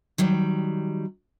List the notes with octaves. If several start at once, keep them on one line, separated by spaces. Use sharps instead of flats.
D#3 F#3 G3